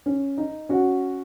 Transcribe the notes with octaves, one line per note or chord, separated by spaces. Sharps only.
C#4
D#4
C#4 F#4